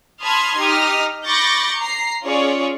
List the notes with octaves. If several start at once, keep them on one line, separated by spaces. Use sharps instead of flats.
A5 B5 C6 D#6 F6 G#6
D#4 G4 D#6 F6
B5 C#6 D6 G6 A6 A#6
A#5 C7
C#4 F4 G#4 C#5 D5